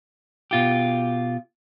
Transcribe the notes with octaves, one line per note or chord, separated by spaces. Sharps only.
B2 F4 G4